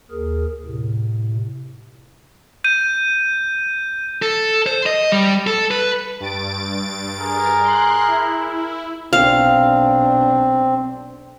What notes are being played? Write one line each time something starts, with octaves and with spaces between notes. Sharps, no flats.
D#2 G#4 A#4
A2 C3
G6 D#7
A4
C5
D#5
G3
A4
B4
G2 A6 D7
G#4 A#4
C6 F#6
E4
B1 C4 D4 F5